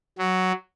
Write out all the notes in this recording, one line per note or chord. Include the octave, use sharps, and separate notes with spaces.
F#3